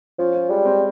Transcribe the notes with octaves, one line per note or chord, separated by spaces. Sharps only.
F3 C#4
C#4
G3 G#3
C4